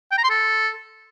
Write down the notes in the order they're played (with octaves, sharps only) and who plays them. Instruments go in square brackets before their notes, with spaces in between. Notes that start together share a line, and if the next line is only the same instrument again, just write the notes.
[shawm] G5
A#5
C6
A4